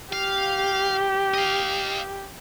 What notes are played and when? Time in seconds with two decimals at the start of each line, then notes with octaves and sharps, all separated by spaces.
0.13 G4 F5
1.35 D#5 F5